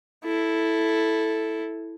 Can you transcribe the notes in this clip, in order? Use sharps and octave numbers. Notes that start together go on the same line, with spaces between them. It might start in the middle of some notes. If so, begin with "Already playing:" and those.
E4 A4